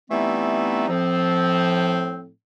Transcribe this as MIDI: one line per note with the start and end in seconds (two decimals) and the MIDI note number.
0.11 0.87 52
0.11 0.87 55
0.11 0.87 57
0.11 0.87 59
0.11 0.87 60
0.11 0.87 63
0.89 2.28 45
0.89 2.28 53
0.89 2.28 60